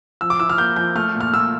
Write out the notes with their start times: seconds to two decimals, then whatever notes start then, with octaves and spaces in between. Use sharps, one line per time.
0.21 F3 E6
0.30 D6
0.40 E4 E6
0.49 F6
0.58 A#3 G6
0.76 F3 G6
0.96 A3 F6
1.15 A#2
1.21 F6
1.33 A#2 E6